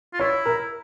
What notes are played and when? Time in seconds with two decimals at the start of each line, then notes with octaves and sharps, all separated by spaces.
0.13 F4
0.19 E4 C#5
0.45 A#4